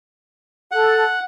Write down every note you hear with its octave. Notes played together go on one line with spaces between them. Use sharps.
A4 F#5